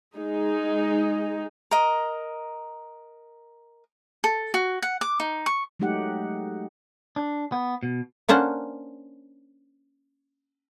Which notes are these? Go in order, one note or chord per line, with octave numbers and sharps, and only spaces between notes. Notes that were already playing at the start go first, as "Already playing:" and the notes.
G#3 D#4 G#4
A#4 D#5
A4
F#4
F#5
D6
D#4
C#6
F#3 G#3 A3 D#4 G4 F#5
D4
B3
B2
A#3 C#4 D4 C5 F#5